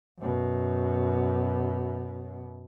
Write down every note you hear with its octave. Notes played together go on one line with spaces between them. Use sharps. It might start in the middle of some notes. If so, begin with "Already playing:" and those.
F#2 B2